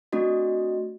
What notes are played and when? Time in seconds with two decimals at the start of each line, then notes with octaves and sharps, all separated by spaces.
0.12 A3 C4 D4 F#4 D#5